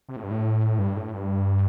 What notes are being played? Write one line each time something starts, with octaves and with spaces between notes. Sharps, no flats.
C3
A2
G2
A2
G2
A2
G2